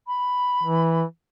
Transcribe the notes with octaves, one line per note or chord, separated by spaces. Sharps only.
B5
E3